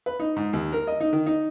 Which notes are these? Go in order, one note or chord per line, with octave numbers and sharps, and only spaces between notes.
B4
D#4
G#2
D#2
A#4
D#5
D#4
D#3
D#4